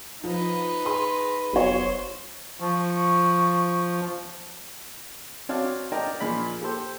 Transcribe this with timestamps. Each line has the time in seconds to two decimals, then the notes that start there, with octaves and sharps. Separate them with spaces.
0.24 F3 D#4 B4
0.85 G#4 C6
1.53 F1 F#3 B3 C5 C#5
2.60 F3 C#6
5.49 C4 F#4 C#5 D5 F5 A5
5.92 A#4 D5 D#5 G5 A5 A#5
6.20 A#2 F3 G#4 D5 B5
6.62 G4 A4 C5